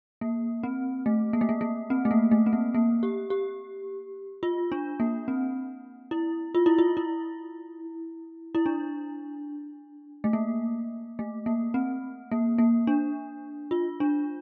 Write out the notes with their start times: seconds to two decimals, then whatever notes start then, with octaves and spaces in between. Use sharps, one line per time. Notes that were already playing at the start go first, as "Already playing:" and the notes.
0.21 A#3
0.63 C4
1.06 A3
1.33 A#3
1.41 A3
1.49 A#3
1.61 A#3
1.90 C4
2.05 A3
2.11 A#3
2.31 A3
2.46 C4
2.53 A#3
2.75 A#3
3.03 G4
3.30 G4
4.43 F4
4.72 D4
5.00 A#3
5.28 C4
6.11 E4
6.55 F4
6.66 E4
6.78 F4
6.97 E4
8.55 E4
8.66 D4
10.24 A3
10.33 A#3
11.19 A3
11.46 A#3
11.74 C4
12.31 A#3
12.58 A#3
12.87 D4
13.71 F4
14.00 D4